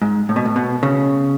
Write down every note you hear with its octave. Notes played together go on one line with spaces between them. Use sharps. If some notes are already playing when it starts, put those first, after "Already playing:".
G#2
A2
B2
A2
B2
C#3